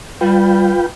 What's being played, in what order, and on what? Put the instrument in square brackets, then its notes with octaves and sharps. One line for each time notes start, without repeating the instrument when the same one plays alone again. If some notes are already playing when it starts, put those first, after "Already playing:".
[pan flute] G3 [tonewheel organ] F4 B4 G5